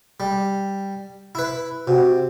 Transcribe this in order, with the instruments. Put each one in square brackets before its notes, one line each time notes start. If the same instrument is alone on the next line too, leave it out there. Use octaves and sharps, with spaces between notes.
[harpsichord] G3
E4 B4
[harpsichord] C3 [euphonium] F#4